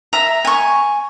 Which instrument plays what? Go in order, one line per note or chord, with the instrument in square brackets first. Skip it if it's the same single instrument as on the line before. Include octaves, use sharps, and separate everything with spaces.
[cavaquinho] E5 A#5
G#5 C#6